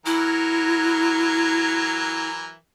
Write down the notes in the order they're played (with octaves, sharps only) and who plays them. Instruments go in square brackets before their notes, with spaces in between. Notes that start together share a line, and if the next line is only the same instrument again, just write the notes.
[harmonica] E3 F#3 A#4 [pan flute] E4